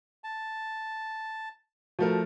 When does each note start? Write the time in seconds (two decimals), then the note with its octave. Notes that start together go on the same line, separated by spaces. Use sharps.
0.24 A5
1.99 F3 A3 F#4 A#4